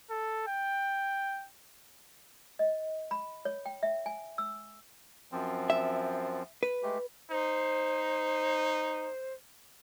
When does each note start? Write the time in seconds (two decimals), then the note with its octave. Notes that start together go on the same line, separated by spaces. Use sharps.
0.11 A4
0.48 G5
2.59 D#5
3.11 B5
3.45 C#5
3.66 G5
3.83 E5
4.06 G#5
4.38 E6
5.32 F#2 F3 C4
5.70 E5
6.63 B4
6.83 G#3 A3 G4
7.31 D#4 C5